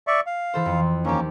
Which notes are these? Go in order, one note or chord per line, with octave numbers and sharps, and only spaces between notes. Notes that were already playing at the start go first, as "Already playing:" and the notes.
D5 E5 C#6
F5
E3 A4 C5
F2
D#2 A#3 C#4 G4